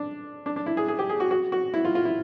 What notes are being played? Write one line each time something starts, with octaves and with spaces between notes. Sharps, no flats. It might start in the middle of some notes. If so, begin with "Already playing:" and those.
Already playing: D4
D4
D4
E4
G#4
G#4
G4
G#4
F#4
F#4
F#4
E4
F4
F4
E4